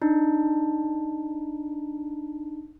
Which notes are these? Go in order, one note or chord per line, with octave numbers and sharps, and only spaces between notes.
D4 D#4